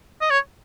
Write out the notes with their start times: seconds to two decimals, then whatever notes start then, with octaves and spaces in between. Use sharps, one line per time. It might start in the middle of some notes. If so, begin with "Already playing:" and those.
0.21 D#5
0.30 C#5